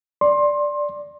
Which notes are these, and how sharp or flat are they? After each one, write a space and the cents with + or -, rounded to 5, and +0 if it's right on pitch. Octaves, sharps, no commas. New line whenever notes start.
D5 +0 C6 +20